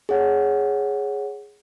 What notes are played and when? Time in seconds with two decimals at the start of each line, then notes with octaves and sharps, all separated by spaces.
0.09 G#4 C#5 F#5